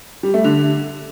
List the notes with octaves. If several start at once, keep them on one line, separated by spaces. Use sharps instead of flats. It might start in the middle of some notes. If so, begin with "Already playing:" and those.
G3
A3
D3